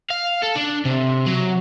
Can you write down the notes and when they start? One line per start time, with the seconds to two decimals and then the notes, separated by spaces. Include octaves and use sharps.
0.10 F5
0.42 A4
0.55 D4
0.85 C3
1.26 F#3